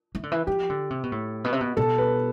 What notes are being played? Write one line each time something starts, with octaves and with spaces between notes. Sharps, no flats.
E3
D3
E3
F3 G4
D3
C3
B2
A2
B2
C3
B2
B2 A4
B4